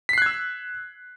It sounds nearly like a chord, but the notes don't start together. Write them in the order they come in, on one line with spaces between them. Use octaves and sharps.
B6 C7 F#6 G#6 E6